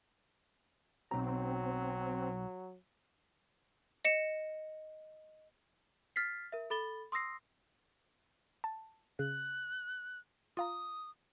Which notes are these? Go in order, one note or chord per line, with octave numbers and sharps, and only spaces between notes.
B1 F#3 C4 A#5
D#5 C#7 E7
F6 A6 B6 C7
A#4 E5
A4 B5 A6 G7
C6 D#6 E6 A#6 C7
A5
C#3 F#6
F4 F5 A#5 D#6